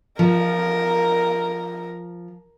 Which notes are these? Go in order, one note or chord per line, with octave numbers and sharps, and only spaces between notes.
F3 A#4